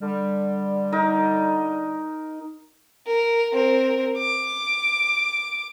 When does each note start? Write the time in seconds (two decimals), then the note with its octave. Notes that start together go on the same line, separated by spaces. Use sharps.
0.01 D3 G3
0.92 D#4 A#4
3.07 A#4
3.53 C4 A#4
4.18 D6